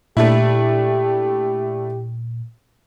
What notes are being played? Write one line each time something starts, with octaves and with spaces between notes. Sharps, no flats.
A#2 A3 D4 E4 G4